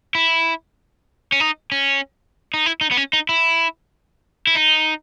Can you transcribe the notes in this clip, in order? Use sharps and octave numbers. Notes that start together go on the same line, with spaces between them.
E4
C#4
D#4
C#4
D#4
E4
D#4
B3
C#4
D#4
E4
E4
D#4